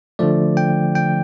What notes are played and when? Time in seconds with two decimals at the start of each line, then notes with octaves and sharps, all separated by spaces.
0.19 D3 F3 A3 D5
0.57 G5
0.95 G5